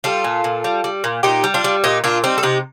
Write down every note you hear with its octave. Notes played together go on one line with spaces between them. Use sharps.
G3 F4 A4
A#2
A#2
G3
G3
A#2
A#2 D#4 G4
G3
D4 F4
G3
A#2 D#4 G4
A#2 D4 F4
G3 C4 D#4
A4
C3 D#4 G4